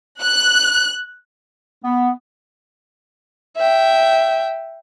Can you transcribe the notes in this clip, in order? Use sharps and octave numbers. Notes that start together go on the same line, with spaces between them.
F#6
B3
E5 G5